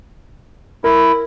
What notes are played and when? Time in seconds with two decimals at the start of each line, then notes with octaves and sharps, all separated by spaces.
0.84 E4 A#4